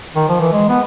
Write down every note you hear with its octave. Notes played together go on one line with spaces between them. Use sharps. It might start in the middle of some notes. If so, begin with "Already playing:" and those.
D#3
F3
E3
G#3
B3